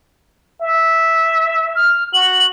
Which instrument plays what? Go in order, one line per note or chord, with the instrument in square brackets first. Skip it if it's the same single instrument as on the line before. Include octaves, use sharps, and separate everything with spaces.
[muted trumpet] E5
[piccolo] F6
[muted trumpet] F#4 [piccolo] F#7